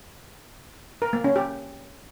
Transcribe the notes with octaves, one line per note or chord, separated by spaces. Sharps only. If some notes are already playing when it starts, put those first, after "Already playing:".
A#4
A#3
C#4
G4